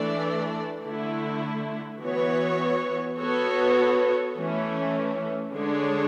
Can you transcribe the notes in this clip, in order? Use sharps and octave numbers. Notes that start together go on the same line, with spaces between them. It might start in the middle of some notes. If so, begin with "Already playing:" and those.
Already playing: E3 A3 D4 A4 D5
D3 A3 E4
E3 B3 F#4 C#5
B3 F#4 A4 C#5
E3 A3 C#4
D3 G#3 D4 G#4 C#5